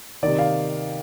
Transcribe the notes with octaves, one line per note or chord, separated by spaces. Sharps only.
C3 D#3 D5
F5